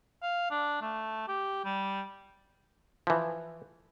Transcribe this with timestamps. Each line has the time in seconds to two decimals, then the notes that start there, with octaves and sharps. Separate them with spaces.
0.22 F5
0.50 D4
0.82 A3
1.28 G4
1.65 G3
3.07 E3 F3